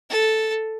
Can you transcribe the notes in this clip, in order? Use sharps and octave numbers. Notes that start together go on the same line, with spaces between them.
A4